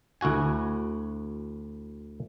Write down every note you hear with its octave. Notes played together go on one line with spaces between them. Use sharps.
D2 E4 F#4 G#5